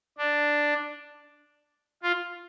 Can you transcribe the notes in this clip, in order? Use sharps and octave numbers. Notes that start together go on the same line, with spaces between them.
D4
F4